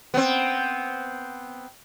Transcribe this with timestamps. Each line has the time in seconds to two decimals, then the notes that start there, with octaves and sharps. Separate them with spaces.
0.14 B3 C4